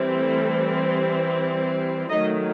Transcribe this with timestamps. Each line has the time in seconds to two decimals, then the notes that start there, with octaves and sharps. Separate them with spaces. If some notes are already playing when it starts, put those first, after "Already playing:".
Already playing: E3 G3 C4
0.12 A3 A4
2.10 D#3 F#3 A3 D#4 D#5